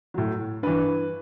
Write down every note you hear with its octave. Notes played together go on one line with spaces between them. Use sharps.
A2 F#3
G2 E3 B4